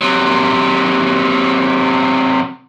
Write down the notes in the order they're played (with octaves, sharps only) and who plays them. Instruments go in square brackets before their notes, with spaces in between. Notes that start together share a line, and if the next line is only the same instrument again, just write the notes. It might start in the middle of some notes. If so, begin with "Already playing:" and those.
[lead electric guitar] C3 F#3